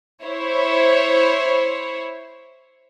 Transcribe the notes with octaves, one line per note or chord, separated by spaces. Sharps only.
E4 C5 C#5